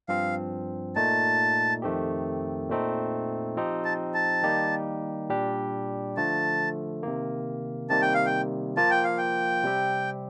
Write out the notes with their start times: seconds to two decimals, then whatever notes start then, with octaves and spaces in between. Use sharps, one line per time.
0.08 G2 F3 C4 F5
0.96 A#2 A3 D#4 A5
1.82 F2 D#3 A3 C4 G4
2.69 A#2 A3 C4 D#4
3.57 F3 C4 D#4 G4
3.85 A5
4.14 A5
4.43 D#3 G3 A#3 D#4 G4
5.30 A#2 G3 D4 G4
6.17 D3 F3 A3 A5
7.03 C3 D#3 A#3
7.90 C3 D#3 G3 A#3 A5
8.02 G5
8.14 F5
8.26 G5
8.77 F3 A#3 F4 A5
8.91 G5
9.04 F5
9.18 G5
9.64 C3 G3 C4 G4